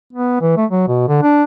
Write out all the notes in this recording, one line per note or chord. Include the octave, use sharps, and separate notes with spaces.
B3
E3
A3
F#3
B2
D3
D4